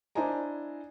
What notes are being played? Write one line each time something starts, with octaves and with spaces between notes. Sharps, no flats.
D4 E4 C5 D#5 G#5 A#5